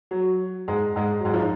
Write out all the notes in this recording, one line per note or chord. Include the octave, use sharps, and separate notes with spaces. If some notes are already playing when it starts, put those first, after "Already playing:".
F#3
G#2 G#3
G#2 G#3
F#3
G#2 G#3
F3 F4
D#4